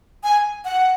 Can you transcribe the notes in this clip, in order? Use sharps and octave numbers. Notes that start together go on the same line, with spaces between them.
G#5
F#5